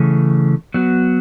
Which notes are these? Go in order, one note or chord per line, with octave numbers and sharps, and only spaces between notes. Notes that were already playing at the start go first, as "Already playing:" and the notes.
Already playing: C#3 E3 A3 C#4 G#4
F#3 B3 F#4